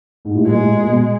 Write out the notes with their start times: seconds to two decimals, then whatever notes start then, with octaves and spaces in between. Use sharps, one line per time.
0.25 G#2
0.35 A2
0.46 A#2 G#3
0.60 A2
0.75 A#2
0.89 B2